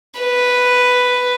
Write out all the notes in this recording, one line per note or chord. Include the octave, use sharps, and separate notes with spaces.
B4